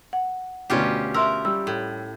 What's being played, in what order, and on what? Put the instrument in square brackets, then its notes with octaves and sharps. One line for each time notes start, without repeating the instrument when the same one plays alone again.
[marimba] F#5
[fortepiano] D2 B2 D4 [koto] C#4 F4 G4
[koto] A#4 [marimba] E5 C6 E6
[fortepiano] G3 [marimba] E6
[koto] A2